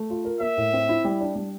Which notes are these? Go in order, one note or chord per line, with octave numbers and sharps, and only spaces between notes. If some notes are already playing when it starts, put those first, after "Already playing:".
Already playing: A3
F4
A#4
A#3 E5
A2
C4
E4
G3
D4
G3